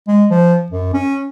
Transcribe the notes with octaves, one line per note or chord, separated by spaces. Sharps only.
G#3
F3
F#2
C#4